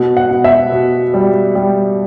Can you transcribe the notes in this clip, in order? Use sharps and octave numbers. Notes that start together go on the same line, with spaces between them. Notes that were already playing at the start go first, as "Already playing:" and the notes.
Already playing: B2
F#5
B2
E5
B2
G3
G3